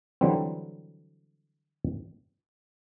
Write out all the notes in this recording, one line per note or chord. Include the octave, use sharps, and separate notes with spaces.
D3 E3 F#3 G3 C4